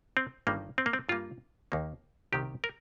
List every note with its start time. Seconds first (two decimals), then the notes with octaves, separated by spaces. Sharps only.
0.17 C4
0.47 G1 G2 D#3 G3 A#3
0.78 C4
0.86 A#3
0.93 C4
1.09 G2 G3 A#3 F4
1.72 D#2 D#3 A#3
2.32 C2 C3 D#3 A#3 G4
2.64 A#4